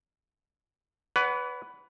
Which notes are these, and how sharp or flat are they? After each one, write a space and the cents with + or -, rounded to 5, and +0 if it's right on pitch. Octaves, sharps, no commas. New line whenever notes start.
B4 +5 D5 -45 F#5 +10